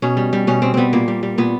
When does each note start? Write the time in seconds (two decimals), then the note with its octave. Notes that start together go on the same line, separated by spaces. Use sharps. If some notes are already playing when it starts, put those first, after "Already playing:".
0.02 B2 C#4
0.17 G3
0.33 G3
0.47 B2 C#4
0.62 B2 C4
0.74 G3 B3 C4
0.93 A#2 A#3
1.08 G3
1.23 G3
1.38 A#2 B3